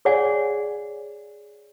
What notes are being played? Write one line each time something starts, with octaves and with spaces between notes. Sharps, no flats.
G#4 C#5 D5 F#5 G#5